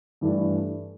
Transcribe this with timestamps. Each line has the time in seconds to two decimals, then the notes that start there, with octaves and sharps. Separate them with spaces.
0.21 G2 E3 A3 D4